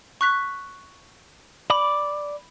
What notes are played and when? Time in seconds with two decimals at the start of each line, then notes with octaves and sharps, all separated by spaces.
0.21 C#6 F#6 B6
1.70 D5 B5